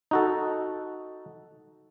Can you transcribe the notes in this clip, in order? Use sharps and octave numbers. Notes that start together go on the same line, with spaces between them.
D#4 F#4 A4